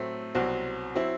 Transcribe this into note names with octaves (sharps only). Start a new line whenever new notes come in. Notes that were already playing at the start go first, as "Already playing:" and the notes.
Already playing: A2 F#3 A3 C4
C2 B2 F#3 C4 F#4
F#3 C4 E4